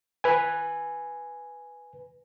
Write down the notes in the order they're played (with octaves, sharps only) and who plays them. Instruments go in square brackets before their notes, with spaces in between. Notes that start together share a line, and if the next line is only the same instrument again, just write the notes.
[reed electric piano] B4 G#5